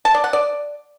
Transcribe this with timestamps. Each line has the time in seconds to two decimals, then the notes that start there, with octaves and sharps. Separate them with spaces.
0.05 A5
0.14 D5
0.24 F#5
0.33 D5